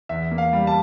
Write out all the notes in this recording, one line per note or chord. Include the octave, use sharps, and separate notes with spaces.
E2 E5
A#3
F5
G3
A5